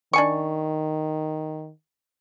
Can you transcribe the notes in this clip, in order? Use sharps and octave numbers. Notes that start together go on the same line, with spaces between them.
D#3 D4 G#5 C#6